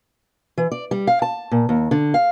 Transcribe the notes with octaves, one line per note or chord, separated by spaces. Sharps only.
E3
D5
G3
F5
A5
A#2
D#2
D3
F5